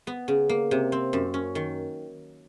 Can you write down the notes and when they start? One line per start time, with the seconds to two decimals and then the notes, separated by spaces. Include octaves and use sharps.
0.07 B3
0.28 C#3
0.49 A#3
0.71 C3
0.92 C4
1.13 F#2
1.34 C#4
1.55 D#3